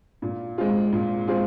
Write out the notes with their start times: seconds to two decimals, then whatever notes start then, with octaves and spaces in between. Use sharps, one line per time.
0.22 A#2
0.58 G#3 C4 F4 G#4
0.93 A#2
1.28 G#3 C4 F4 G#4